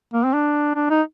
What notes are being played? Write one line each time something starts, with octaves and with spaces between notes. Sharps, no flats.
A#3
C4
D4
D4
D#4